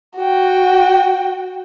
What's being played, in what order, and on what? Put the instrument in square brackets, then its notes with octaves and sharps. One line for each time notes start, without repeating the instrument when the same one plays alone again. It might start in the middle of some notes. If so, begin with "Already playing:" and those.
[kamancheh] F#4 G5